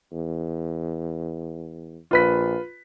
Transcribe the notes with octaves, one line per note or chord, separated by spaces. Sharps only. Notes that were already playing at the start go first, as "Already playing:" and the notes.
E2
A#1 F4 B4 B6